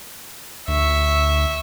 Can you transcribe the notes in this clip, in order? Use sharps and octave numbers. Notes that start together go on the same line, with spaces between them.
D2 E5 C#6